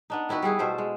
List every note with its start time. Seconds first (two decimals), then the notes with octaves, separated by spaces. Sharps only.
0.10 B3 D4 D#4
0.29 D#3 E4 F#4 B4
0.42 G3 E4 G#4 B4
0.59 B2 A3 C5 E5
0.78 G#3